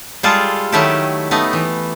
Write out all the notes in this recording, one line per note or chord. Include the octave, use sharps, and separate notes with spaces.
G3 G#3 F4 G#4 A4
D#3 F#3 A3 E4 G4 A4
A3 B3 D#4
E3